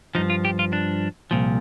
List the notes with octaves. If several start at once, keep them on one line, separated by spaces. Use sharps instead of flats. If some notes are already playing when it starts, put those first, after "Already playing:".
G2 F3 D#4
F4
G4
F4
D4
C2 A#2 F3